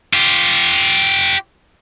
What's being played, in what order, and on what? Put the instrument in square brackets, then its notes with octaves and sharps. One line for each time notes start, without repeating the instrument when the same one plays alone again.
[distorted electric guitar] F4 G4